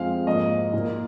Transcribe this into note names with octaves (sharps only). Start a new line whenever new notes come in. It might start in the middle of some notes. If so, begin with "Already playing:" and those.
Already playing: F2 F3 G#3 C4 F5
G#2 F3 A#3 D#5
A#2 A#3